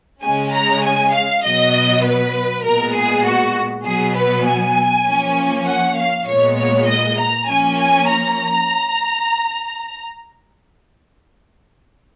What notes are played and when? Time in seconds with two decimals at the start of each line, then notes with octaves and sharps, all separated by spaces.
0.22 C#3 G#3 C#4 G#5
0.53 A#5
0.84 G#5
1.14 F5
1.44 B2 F#3 B3 D#5
2.04 B4
2.64 A#2 G#3 B3 A#4
2.94 G#4
3.25 F#4
3.85 B2 F#3 B3 G#4
4.16 B4
4.45 G#5
5.06 F3 A#3 C#4
5.67 F#5
5.97 F5
6.27 A#2 G#3 B3 C#5
6.58 C#5
6.88 D#5
7.18 A#5
7.48 F3 A#3 C#4 G#5
7.78 G#5
8.08 A#5